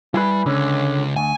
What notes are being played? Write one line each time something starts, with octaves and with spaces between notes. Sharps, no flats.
G3 E4 G#4 B4
C#2 D3 C#4
D2 G#5